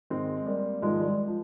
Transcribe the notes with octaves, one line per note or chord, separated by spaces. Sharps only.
G#2 D#3 G#3 C4
G3 A#3
G#2 D#3 F3 G#3
G3
F3